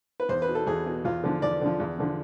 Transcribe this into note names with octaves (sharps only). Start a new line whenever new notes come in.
B4
E2 C5
B4
B2
A4
E2 G#4
B2
E2 F4
D3 F3
E2 D5
D3 F3
E2
D3 F3